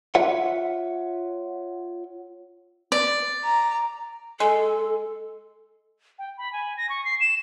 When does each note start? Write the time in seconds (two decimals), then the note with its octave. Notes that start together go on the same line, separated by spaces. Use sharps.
0.15 F4 C#5 E5 F#5
2.92 D5
3.44 A#5
4.40 G#3 A4
6.19 G5
6.38 B5
6.53 G#5
6.77 A#6
6.89 C#6
7.05 C7
7.20 E7